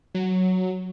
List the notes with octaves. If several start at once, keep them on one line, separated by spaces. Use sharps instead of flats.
F#3